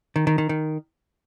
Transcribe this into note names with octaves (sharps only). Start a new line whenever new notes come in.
D#3
D#3
D#3
D#3